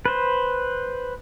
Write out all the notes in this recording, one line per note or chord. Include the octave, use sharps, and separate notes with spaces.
B4 C5